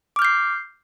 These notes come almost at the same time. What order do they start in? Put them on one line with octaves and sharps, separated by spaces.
D6 F6 G6 C7